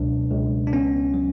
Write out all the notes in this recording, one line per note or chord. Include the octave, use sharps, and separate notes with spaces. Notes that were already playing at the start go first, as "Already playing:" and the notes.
Already playing: C#2 B2 F#3 D4
C#2
D4
B3 C#4
F#3